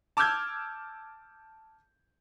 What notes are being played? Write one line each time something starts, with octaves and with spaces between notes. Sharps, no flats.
A5 D6 E6 F6 G6 G#6